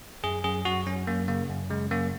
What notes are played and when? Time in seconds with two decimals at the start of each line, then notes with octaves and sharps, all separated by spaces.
0.24 F#2 G#4
0.44 F#2 G#4
0.65 F#2 F#4
0.87 F#2 C#4
1.07 F#2 A#3
1.28 C#3 A#3
1.49 F#2
1.70 C#3 G#3
1.91 F#2 A#3